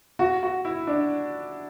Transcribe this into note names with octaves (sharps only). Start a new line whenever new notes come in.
F#4
F#4
E4
D4